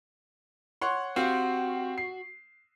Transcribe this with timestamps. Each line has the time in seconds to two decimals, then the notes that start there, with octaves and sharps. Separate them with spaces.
0.81 C#5 F#5 C6
1.16 C4 F#4 G4 F5
1.98 C7